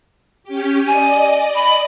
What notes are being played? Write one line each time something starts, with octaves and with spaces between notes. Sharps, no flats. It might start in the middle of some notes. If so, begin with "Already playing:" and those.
C#4 G4
D5 D#5 G#5
B5